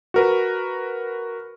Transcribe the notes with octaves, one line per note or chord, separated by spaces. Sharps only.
F#4 A#4 B4